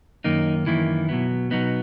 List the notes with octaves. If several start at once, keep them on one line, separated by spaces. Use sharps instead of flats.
F#2 D#3 A#3 D#4
F#2 D#3 E3 A#3 E4
B2 F#3 B3
B2 F#3 B3 D#4